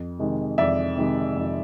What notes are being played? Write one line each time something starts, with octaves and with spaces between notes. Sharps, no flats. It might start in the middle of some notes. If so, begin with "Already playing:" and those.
Already playing: F2
C3 D#3 G#3
F2 D5 E5
C3 D#3 G#3
F2